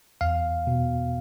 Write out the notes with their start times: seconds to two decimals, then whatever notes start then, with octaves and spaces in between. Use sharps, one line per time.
0.21 E2 F5
0.67 B2